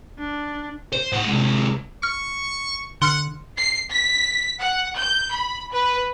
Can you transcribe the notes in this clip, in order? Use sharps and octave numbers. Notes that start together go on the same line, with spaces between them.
D4
C5
A2 F#5
C3 G#3
C#6 F6
D3 F#5 C6 F6 C#7
C7
B6
F#5
G6
B5
B4